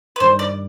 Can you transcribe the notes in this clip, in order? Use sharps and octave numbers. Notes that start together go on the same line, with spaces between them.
B4
G2 D#3 G3 C5
D5